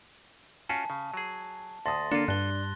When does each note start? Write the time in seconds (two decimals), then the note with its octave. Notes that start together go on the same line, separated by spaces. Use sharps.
0.69 C#4 F4 F#4 G#5 A5
0.90 C#3
1.14 F#3 G#4
1.86 D2 A5 C6 D#6 A6 A#6
2.11 D3 A#3 D4 F4 A4
2.28 G2 D4 F#6 G7